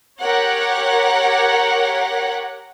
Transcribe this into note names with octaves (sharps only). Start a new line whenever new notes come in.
G4 A#4 C#5 F#5